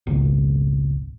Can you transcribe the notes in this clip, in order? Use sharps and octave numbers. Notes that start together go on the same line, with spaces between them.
G#1 C#2